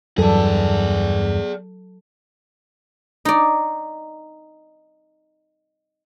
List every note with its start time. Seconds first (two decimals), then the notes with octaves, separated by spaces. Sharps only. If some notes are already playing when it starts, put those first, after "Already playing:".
0.18 E2 G2 F#3 G#4 A4 D5
3.25 D#4 D5